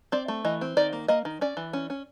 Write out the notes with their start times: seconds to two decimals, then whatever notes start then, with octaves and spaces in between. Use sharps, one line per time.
0.12 C4 D5
0.28 A3
0.45 E3 D#5
0.61 C4
0.77 D#3 D5
0.93 A#3
1.08 A#3 D#5
1.25 D#3
1.41 C#4 D5
1.57 E3
1.73 C#4
1.90 C#4